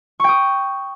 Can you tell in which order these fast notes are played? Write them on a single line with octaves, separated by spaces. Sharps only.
C#6 G5 D#6